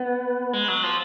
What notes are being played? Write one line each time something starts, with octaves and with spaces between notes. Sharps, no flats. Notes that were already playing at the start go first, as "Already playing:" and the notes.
Already playing: B3
G#3
F#3
F3